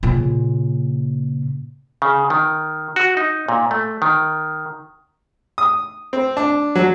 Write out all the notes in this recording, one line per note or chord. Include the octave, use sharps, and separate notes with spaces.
A#2 C#3
C#3
D#3
F#4
D#4
A#2
A3
D#3
D#6
C4
D4
F#3